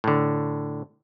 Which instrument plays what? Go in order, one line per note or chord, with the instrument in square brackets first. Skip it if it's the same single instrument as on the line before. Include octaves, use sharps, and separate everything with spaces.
[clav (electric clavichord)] A2 D3